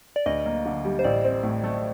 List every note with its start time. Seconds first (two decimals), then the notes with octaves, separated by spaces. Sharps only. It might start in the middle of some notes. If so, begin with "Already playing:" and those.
0.16 D5
0.26 D2 D#5
0.46 A#3
0.65 D3
0.85 G3
0.99 C5
1.04 A1 D5
1.24 C4
1.43 A2
1.64 A3